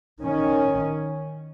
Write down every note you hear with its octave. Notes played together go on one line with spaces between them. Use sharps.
D#3 C#4